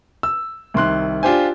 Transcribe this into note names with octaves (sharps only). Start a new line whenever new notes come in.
E6
C2 D#3 C6 F#6
D4 F4 G4 C5 G#5